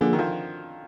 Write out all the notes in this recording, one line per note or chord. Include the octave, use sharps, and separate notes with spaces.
D3 F3 A#3 F4 G#4
D#3
F3